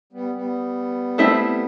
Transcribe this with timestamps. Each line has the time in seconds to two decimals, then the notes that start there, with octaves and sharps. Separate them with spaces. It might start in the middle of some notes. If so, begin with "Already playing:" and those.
0.13 G3 B3
0.34 G3 B3
1.18 A3 C4 E4 A4 E5